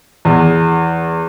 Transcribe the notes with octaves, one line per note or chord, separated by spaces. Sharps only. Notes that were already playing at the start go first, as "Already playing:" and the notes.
E2